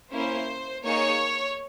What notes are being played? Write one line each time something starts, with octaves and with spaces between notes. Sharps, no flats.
A#3 C#4 E4 C5
A#3 D#4 G#4 C#5